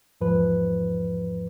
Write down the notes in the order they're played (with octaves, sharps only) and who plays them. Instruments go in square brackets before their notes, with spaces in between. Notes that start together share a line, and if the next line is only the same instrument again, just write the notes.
[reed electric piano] E2 G#2 F3 B4